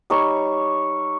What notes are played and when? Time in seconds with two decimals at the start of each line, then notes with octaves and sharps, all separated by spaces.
0.10 G3 D#4 C#5 C#6